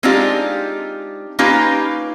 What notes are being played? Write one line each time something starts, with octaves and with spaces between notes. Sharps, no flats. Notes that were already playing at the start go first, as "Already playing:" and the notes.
G#3 C4 D4 D#4 F4 G4
A#3 C#4 D#4 F4 G4 B4